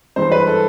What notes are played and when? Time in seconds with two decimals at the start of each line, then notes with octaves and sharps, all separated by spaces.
0.16 G2 E3 G#3 C5
0.32 B4
0.47 A4